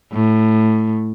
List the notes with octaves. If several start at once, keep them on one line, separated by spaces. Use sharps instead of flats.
A2